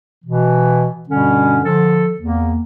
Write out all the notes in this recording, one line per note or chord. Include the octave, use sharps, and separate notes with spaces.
B2 E3
G2 B2 D3 G3 C#4
D3 F3 A4
E2 A#3